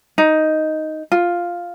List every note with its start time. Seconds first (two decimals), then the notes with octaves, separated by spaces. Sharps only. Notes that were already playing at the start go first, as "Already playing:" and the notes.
0.18 D#4
1.12 F4